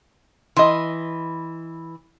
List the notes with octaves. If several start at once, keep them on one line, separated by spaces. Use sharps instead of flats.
E3 D#5 C6